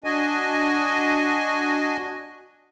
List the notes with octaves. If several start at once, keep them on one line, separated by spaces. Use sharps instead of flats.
D4 F#4 D#5 G#5